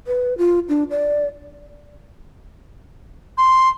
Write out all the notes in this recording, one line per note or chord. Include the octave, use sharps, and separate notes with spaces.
B4
F4
D4
D5
C6